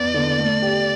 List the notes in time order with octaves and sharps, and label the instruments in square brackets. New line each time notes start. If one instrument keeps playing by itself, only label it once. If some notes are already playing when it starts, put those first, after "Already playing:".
Already playing: [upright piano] E2 B3 [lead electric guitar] D5
[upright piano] D3
A3
G4